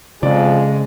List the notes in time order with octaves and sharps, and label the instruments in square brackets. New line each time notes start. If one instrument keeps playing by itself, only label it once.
[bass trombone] F2 [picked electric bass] C#3 [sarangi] G#3 [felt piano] D5